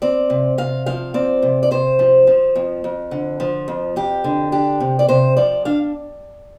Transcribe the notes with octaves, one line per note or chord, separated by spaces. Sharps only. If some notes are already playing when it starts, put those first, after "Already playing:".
C4 D5
C3
C3 F5
F3 F5
C4 D5
C3
D5
C3 C5
F3
F3
F2
F2
D3
F3
F2
F2 G4
D3
D4 G4
C3
D5
C3 C5
F3 D5
D4 F5